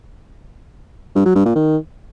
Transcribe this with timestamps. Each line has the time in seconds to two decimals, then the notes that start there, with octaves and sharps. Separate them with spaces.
1.15 G2
1.25 F#3
1.35 G2
1.45 A#2
1.55 D#3